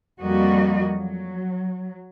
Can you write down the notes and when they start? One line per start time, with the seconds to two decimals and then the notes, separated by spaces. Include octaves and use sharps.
0.20 F2 G3 A#3 F#4 D#5
0.93 F#3